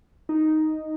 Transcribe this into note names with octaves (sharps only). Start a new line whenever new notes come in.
D#4